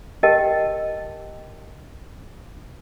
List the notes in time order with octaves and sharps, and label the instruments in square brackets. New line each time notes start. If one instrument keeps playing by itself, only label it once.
[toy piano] G4 A#4 D#5 G5 A5